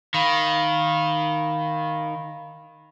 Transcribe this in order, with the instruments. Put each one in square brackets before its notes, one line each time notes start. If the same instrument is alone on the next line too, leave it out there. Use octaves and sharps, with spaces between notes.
[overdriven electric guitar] D#3 [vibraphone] F5 B5